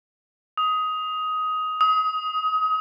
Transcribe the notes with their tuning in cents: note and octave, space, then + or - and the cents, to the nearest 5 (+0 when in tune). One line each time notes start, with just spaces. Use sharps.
D#6 +15
D#6 +30